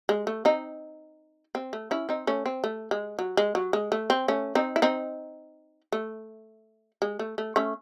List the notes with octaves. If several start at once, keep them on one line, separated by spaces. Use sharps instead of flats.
G#3
A3
C4 D#4
C4
A3
C#4 E4
C4 D#4
A3 C#4
C4
A3
G#3
F#3
G#3
F#3
G#3
A3
C4
A3 C#4
C4 D#4
E4
C4 D#4
A3
G#3
A3
A3
A3 C#4